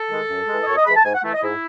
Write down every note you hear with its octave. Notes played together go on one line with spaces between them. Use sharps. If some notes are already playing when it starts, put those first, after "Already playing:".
Already playing: A4
D#3 G#3
F#2
E3 G#3
D#5
F#2 C#5
D#5
E3 G#3 B5
A5
G#2 G#5
F#5
E3 A3
D#5
G#2 E4